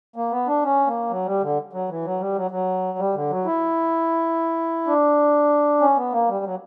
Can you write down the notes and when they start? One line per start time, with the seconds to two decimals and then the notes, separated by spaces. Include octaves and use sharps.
0.16 A#3
0.31 B3
0.47 D4
0.64 C#4
0.87 A#3
1.10 F#3
1.26 G3
1.42 D3
1.73 F#3
1.89 E3
2.05 F#3
2.20 G3
2.36 F#3
2.51 F#3
2.99 G3
3.15 D3
3.30 F#3
3.45 E4
4.87 D4
5.81 C#4
5.97 B3
6.13 A#3
6.28 G3
6.45 F#3